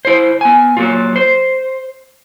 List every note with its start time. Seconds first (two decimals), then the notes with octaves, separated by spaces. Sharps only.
0.05 E4 C5
0.41 B3 G#5
0.77 F#3 A#3 F4
1.16 C5